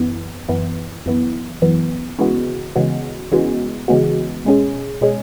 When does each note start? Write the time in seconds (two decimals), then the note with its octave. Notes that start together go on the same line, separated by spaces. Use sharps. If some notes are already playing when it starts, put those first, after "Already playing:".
Already playing: F#2 E3 B3
0.49 F#2 E3 B3
1.06 F#2 E3 B3
1.62 F#2 E3 B3
2.18 C#3 E3 G#3 B3 F#4
2.76 C#3 E3 G#3 B3 F#4
3.32 C#3 E3 G#3 B3 F#4
3.88 C#3 E3 G#3 B3 F#4
4.45 B2 G#3 C#4 G#4
5.01 B2 G#3 C#4 G#4